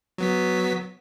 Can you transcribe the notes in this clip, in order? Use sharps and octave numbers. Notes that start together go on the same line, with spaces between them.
F#3 B3 B6